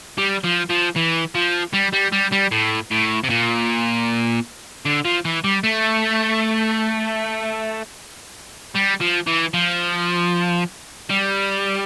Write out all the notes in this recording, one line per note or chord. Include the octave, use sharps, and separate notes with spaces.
G3
F3
F3
E3
F3
G3
G3
G3
G3
A2
A2
C3
A#2
D3
F3
E3
G3
A3
G3
F3
E3
F3
G3